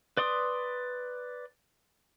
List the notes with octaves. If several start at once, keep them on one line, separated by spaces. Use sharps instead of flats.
B4 D5 C6 D#6